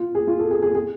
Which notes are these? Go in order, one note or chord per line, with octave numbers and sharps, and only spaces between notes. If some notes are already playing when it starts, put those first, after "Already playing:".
Already playing: F4
G#4
F4
A4
G#4
G#4
G#4